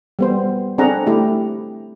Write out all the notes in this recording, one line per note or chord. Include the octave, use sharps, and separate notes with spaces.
G3 B3 C5
C4 D4 G#4 A4 F#5 A#5
A3 E4 G4